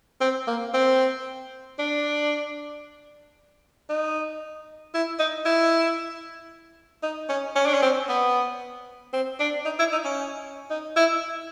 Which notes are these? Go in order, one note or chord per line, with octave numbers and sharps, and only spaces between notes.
C4
A#3
C4
D4
D#4
E4
D#4
E4
D#4
C#4
C#4
D4
C#4
C4
B3
C4
D4
D#4
E4
D#4
C#4
D#4
E4